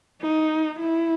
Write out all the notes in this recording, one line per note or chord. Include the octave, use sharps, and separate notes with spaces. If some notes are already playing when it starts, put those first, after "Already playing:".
D#4
E4